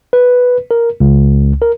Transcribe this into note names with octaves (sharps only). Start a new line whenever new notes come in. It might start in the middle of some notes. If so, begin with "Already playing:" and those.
B4
A#4
C#2
A#4